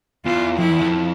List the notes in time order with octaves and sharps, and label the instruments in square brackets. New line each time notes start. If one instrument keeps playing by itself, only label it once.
[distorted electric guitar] E2 [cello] F4
[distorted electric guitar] F2 [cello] E4
[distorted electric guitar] E2
F2